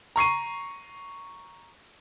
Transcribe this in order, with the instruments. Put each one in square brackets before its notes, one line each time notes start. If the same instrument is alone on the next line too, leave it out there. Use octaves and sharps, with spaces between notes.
[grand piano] A#5 C#6 C7 D#7